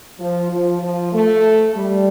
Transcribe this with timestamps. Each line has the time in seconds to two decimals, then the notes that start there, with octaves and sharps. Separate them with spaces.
0.19 F3
0.51 F3
0.82 F3
1.13 A3
1.75 G3